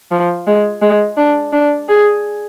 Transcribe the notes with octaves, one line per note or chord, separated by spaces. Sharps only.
F3
G#3
G#3
D4
D4
G#4